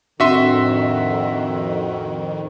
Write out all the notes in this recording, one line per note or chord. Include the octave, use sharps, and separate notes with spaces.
F2 A2 D#3 C4 D4 F#4 E5 C6